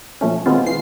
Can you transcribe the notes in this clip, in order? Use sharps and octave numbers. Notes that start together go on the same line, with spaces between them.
A#2 F3 A3 C#4
B2 D#3 G#3 B3 C4 F4
E3 C7